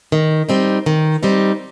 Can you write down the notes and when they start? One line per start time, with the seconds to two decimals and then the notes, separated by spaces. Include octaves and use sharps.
0.12 D#3
0.49 G3 C4 D#4
0.86 D#3
1.23 G3 C4 D#4